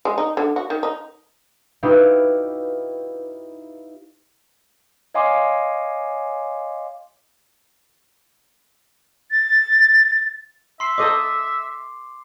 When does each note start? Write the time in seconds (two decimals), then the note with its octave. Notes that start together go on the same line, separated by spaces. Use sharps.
0.05 G#3
0.18 D#4
0.37 D3
0.56 F#4
0.70 D#3
0.83 D#4
1.83 D#4 E4 F#4 G4 B4 F5
5.15 C#5 D#5 F5 G#5 C6 D6
9.31 A6
10.80 E5 C6 C7
10.98 A4 C5 D#5 D6